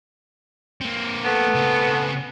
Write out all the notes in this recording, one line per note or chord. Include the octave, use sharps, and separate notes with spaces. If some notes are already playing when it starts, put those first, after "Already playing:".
A#3 C4
A3 B3
C#3 C4